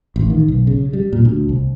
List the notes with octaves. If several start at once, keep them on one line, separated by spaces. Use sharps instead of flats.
A1
D#3
B1
C#3
G3
A#2
D2
C2